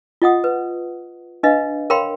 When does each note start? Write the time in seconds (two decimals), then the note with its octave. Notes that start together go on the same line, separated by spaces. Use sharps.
0.22 F4 D#5 F#5 D#6
0.44 B4
1.43 D4 B4 D#5 F5
1.90 A#4 C#5 F5 G5 B5 C6